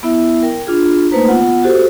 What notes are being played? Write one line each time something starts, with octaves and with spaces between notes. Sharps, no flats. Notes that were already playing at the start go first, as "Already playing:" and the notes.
B3 E4 E5
A#4 G5
D4 F4 G#4
A3 A#3 D#4 B4 C5 A#5
B3 F4 F#5
F#4 G4 A4 C5